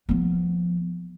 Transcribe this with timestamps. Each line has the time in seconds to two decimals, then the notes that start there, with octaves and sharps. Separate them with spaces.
0.09 F3 B3